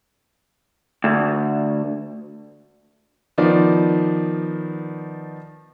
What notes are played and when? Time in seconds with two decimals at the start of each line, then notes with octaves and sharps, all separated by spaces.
1.04 D2
3.38 D#3 F3 B3 D5